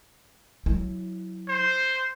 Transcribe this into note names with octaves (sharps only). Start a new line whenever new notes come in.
F#3 E4
C5